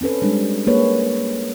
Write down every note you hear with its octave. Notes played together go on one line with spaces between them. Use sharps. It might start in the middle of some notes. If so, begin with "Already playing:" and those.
C4 C#4 A4 B4
G3 G#3 D4
A#3 G#4 B4 C#5